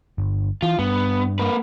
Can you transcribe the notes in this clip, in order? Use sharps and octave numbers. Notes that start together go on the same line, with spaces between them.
G1
E3 F4
G2 B3
A#3 B4